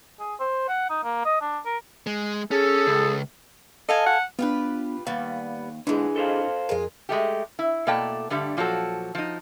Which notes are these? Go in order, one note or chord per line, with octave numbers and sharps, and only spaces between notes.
G#4
C5
F#5
D#4
A#3
D#5
D4
A#4
G#3
C#4 G#4 A4
C#2
A4 D#5 F5 G#5
F#5
B3 D4 F4 G4 B4
D#2 G3 B3 F5
G#2 D3 E3 G#3 D4 E4
A4 C5 F5
F2 G#3 F4 A#4
G#3 A3 G4
E4
B2 A3 A#3 D5 G5 A5
G2 D3 G3 A3
A#2 F3 F#3 F#4 A4
F3 D#4